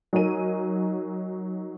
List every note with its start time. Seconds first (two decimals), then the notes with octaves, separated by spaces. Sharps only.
0.13 F#3 D#4 A#4 G#5 D#7